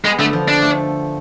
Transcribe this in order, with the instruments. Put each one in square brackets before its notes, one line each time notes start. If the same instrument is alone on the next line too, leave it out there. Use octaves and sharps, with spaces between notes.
[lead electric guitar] G#3 [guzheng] B3
[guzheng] D3 [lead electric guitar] A3
[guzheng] F3
[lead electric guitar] D4
[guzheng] A3